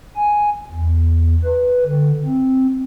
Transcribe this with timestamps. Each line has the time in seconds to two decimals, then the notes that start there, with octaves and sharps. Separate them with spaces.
0.16 G#5
0.71 E2
1.44 B4
1.86 D3
2.25 C4